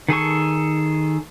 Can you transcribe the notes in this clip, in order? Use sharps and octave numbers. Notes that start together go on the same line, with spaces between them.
D#3 G#4 A4 C#6